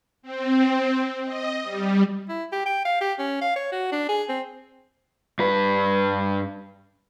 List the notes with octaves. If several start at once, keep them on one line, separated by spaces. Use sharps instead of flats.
C4
D#5
G3
E4
G4
G5
F5
G4
C#4
F5
C#5
F#4
D4
G#4
C4
G2 B4